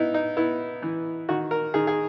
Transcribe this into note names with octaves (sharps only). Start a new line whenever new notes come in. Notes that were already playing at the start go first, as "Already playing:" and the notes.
Already playing: B3 D#4 E4
D#4
B3 E4
E3
D#3 F#4
A#4
D#3 G#4
G#4